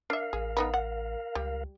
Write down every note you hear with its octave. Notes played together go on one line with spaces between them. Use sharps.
D4 A#4 E5 F5
A1 G#4
B3 D#4 B4
F#5
C#2 G3